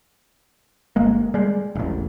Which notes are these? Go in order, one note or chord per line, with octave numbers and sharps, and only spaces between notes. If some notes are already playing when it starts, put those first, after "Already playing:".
G1 G#3 A#3
G3 G#3
E1 A1